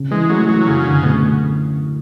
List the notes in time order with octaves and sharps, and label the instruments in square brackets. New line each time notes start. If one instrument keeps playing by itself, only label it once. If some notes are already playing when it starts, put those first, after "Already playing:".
Already playing: [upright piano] C#3
[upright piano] E3 [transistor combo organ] G#3
[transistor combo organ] F#3 [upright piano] A3
[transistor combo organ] F#3 [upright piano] E4
[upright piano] F#2 [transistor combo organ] C#3
[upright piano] D3
[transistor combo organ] B2 [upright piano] A3